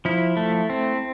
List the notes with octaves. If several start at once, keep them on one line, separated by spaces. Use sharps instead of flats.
F3 E4
A3
C4